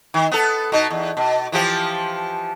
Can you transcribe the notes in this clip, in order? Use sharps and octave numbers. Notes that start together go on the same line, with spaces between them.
D#3
B3 A4
B2 D#4
E2
B2
E3 F3 G4